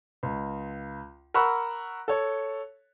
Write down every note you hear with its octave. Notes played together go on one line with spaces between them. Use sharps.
C#2
A#4 F#5 B5 C#6 E6 F#6
A4 C#5